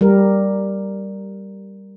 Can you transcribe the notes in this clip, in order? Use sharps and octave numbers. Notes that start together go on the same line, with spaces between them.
G3 A#4